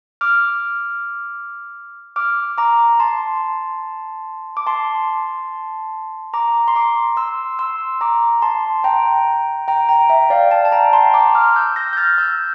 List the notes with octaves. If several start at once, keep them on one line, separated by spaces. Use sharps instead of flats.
D6 F6
D6 F6
A#5 D6
A5 C6
D6
A5 C6
A#5 D6
C6
A#5 D6
C6 E6
C6 E6
A#5 D6
A5 C6
G5 A#5
G5 A#5
G5 A#5
E5 G5
D5 F5
F5 A5
A5
G5 A#5
A5 C6
A#5 D6
D6 F6
E6 G6
G6 A#6
G6
F6 A6
E6 G6